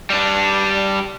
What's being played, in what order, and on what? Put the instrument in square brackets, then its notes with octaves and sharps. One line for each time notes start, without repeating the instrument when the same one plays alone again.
[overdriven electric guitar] G3 D4